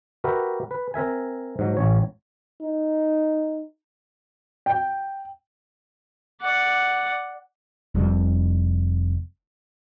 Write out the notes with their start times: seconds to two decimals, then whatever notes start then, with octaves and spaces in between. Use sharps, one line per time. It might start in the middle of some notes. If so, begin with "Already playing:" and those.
0.24 F#4 G4 A#4 B4 E5
0.71 B4
0.94 C4 A#4 E5 G#5
1.59 G#2 F#3
1.77 A1 C#5
2.61 D#4
4.66 G5
6.41 D5 F#5
7.95 F1 F2 C3 G3